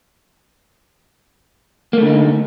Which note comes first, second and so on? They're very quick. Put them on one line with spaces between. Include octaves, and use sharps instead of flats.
A#3 A3 D3 D#4